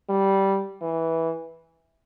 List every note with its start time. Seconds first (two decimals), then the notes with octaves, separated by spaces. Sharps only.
0.09 G3
0.81 E3